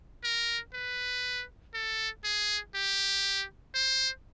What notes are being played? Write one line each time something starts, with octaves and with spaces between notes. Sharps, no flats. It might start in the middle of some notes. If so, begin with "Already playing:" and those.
A#4
B4
A4
G#4
G4
C5